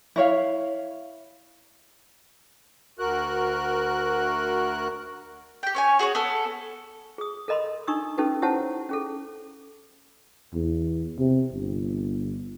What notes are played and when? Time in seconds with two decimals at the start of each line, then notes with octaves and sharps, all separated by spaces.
0.16 E4 C#5 F5
2.99 D2 F#4 A#4 F#6
5.63 G4 G5
5.75 C#4 C#5 G#5
5.99 F#4 G#4 C5 C#5
6.15 B3 A4 F6
7.18 G#4 D#6
7.48 A4 A#4 D#5 B5 C6
7.87 D4 D#4 C#6 D#6 E6
8.18 C#4 D#4 G4 A4 B4
8.42 E4 G4 C5 C#5 F#5 A5
8.89 C#4 G#4 A4
10.54 E2
11.19 C3
11.53 G1